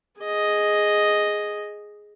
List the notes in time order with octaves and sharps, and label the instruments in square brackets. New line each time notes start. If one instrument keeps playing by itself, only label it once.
[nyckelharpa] G#4 D#5